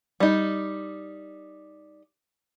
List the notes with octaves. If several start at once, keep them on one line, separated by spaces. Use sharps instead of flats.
G3 D#4